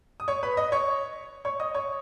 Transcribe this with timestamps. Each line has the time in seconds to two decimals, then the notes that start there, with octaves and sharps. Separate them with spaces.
0.20 D#6
0.28 C#5 C#6
0.43 B4 B5
0.57 D#5 D#6
0.72 C#5 C#6
1.45 C#5 C#6
1.60 D#5 D#6
1.75 C#5 C#6